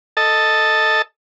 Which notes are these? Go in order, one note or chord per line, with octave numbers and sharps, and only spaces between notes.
A4 D#5 A5